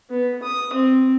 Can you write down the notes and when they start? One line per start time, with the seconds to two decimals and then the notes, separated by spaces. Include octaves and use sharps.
0.10 B3
0.43 D#6
0.73 C4